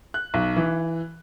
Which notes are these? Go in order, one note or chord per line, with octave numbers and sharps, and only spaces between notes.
F#6
B1
E3